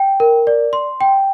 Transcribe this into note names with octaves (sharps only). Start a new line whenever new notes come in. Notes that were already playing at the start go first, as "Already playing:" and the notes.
Already playing: G5
A#4
D5
C6
G5